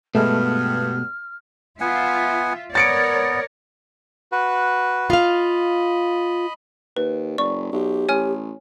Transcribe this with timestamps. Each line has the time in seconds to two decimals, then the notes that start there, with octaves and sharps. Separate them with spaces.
0.15 G2 B2 G#3 A3 B3 F6
1.81 B3 F4 E5 F#5 G#5
2.75 B3 A#4 C#5 D5 A6 C#7 D7
4.32 F#4 B4
5.10 F4 D#5 F5 B5
6.97 D#2 B4
7.38 F#1 D5 C#6
7.73 B1 G4
8.09 A1 C#5 G#5 F6